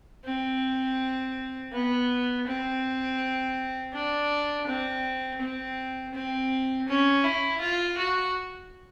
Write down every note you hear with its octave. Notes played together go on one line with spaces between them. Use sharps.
C4
B3
C4
D4
C4
C4
C4
C#4
E4
F4
F#4